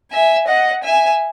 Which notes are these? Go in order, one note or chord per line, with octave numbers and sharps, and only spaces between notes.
E5 G#5
D#5 F#5
E5 G#5